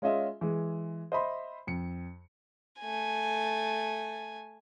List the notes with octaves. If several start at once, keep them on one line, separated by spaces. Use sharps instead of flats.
G#3 C#4 F4 D#5 E5
E3 G#3
C5 D#5 E5 B5 C6
F2 C#7
A3 G#5